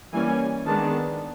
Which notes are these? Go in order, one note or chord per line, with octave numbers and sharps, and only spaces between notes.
E3 G3 A#3 C#4 G#5
D#3 G#3 B3 D4 A5